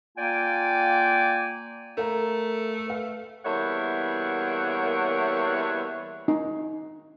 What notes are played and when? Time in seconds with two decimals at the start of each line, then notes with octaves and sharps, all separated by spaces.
0.16 A#3 F4 D5 G5 G#5
1.97 A3 A#4 F5 A#5
2.87 B4 F5
3.45 E2 G3 A#3 C#5 E5 F#5
6.28 D#4